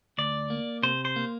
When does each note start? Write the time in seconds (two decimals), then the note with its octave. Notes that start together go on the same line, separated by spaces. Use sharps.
0.18 D2 D5
0.50 A#3
0.83 C3 C5
1.05 C5
1.16 A#3